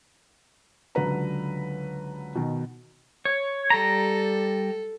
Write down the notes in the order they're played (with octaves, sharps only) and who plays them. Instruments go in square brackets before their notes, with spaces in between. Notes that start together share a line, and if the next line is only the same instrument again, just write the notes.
[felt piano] C#2 D3 F#3 B4 A#5
B2 D#3
[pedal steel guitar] C#5
[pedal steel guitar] G3 A#5 [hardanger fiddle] A4